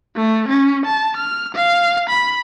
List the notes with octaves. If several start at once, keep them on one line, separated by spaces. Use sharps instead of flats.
A3
C#4
A5
F6
F5
B5